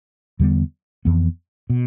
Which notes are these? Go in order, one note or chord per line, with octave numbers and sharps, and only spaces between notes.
E2 D3 G3 B3
F2 E3 B3
B2